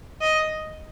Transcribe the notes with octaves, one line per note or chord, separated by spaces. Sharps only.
D#5